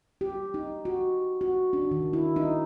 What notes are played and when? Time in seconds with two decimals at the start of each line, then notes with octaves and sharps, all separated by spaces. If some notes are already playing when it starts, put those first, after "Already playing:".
0.21 G4
0.54 D#4
0.85 F#4
1.41 F#4
1.73 D4
1.91 D#3
2.13 E4
2.36 D#4